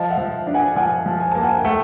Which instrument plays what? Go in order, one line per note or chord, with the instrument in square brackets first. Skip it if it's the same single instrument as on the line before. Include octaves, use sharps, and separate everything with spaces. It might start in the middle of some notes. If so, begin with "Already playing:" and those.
Already playing: [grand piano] F3 [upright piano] D#5 F5
[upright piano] E5 F#5
[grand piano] F3
D4
[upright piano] F#5 G#5
[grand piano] F3 [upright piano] F#5 G#5
[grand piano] F3
[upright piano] G#5
[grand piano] A#3 [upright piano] A5
[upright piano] F#5 G#5
G5
[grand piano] A3 [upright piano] E5 F#5